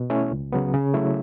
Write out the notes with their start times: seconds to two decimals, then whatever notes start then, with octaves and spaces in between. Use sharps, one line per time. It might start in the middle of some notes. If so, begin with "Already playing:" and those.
Already playing: B2
0.10 A3 C#4 E4
0.31 C#2
0.52 C#3 F#3 B3
0.73 C#3
0.94 F#3 A3 E4